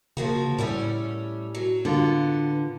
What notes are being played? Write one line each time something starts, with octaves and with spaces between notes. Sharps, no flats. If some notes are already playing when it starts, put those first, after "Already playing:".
C#3 F3 A#3 F#4
A2 G3 A3 C#4
F#3
D3 B3 F4